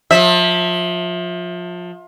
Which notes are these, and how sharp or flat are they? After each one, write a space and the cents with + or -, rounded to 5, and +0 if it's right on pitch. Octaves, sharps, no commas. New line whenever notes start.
F3 +25 E5 -15